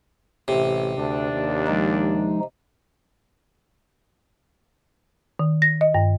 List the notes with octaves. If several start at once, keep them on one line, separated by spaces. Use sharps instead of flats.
A1 C3
D2 D4
D#2
F3 G#3 D#4
D#3
A#6
D#5
G2